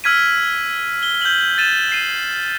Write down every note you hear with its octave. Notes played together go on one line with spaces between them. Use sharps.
E6 F6 G#6 B6 D#7
G7
G6 F#7
A6 D#7 E7
C7 D#7